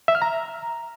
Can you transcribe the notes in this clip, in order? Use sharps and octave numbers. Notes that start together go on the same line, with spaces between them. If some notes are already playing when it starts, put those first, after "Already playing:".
E5
F6
A#5